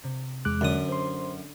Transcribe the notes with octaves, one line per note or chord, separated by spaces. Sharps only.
C3
E2 G#3 D6 F6 F#6
F#2 D3 D#6
C5 C6